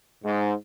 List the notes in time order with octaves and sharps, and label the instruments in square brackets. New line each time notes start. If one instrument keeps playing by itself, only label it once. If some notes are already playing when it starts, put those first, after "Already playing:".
[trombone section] G#2